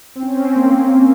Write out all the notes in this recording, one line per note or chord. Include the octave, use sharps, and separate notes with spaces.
C4
C#4
C4
C#4
C4
A#3